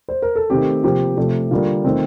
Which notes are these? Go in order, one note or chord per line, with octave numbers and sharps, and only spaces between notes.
C5
A#4
A4
D#3 A3 C4 G4
C3 F3 A#3 G4
C3 F3 A3
D3 G3 A#3 F4
D#3 A3 C4